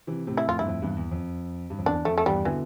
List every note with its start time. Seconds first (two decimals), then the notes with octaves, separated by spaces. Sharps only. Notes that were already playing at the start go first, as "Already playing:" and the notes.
0.07 C3 E3
0.27 A2 C3
0.37 E4
0.47 F2 A2 F4
0.59 G2 E4
0.67 F2 A2
0.82 E2 G2
0.97 E2
1.11 F2
1.70 G2
1.78 F2
1.86 E2 D4
2.05 F2 A3
2.18 A3
2.26 E2 G2 G3
2.45 B2 D3 E3